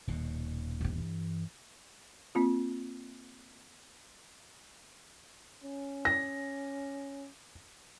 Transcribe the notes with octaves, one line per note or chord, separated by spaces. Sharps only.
D#1 D#2 B2
G2 E3
A#3 C4 F4
C#4
A#6